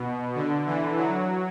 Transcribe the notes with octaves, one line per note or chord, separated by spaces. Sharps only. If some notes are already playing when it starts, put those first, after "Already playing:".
Already playing: B2
D3
E3
F#3